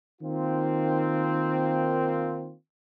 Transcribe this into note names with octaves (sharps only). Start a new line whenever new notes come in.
D#3 A#3 C4 F4